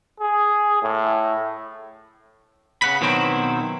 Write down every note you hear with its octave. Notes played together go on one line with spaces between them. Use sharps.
G#4
A2
C#3 F#5 B5
B2 D#3 F#3 C4 E4